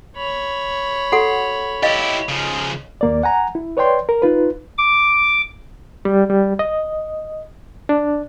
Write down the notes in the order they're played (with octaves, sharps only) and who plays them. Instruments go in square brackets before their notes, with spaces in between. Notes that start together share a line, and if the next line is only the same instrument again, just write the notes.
[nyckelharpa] C#5 B5
[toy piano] F#4 A4 F#5
[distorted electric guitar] E4 G4 [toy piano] D#5 F5
[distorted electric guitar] C#3 F3
[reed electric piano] D#2 A#3 D5
F#5 G#5 A#5
E4
B4 C#5 D5 G5 C6
A#4
D#4 F4 B4
[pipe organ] D6
[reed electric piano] G3
G3
D#5
D4